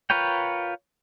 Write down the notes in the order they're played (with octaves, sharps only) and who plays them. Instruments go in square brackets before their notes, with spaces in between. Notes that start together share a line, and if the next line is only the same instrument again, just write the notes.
[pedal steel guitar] F4 A#4 B4 C#5 G5